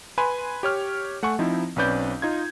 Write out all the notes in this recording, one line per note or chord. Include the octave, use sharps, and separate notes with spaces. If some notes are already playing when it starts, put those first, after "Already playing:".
B4 G#5 B5 C6
G4 C#5 F6
A3 F#5 G#5 C#6
F3 C4 D#4 E4
B1 C4 C#4 B4 D5 G6
D#4 F4 G#6